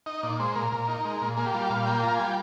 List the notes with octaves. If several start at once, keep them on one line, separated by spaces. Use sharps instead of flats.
D#4 D#5
A#2 D5
G#3 C5
A#2 A#4
A#2
D#4
G#3
A#2
A#3 G#4
G4
G3 F4
G4
A#2 F5
A#3 G5
F4 A#5
G#5
G3 G5